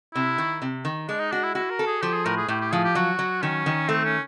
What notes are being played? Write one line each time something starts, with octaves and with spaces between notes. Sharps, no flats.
C3 E4
D#3
C3
D#3
G#3 D4
D#4
D4 F#4
E4
E4 F#4
A#4
A4
G#4
F3 G4
G#4
A2 A#4
G#4
A2 G4
G4
F3 G#4
G4
F#3 F#4
F#3
D#3 C#4
D#3
A3 C4
C#4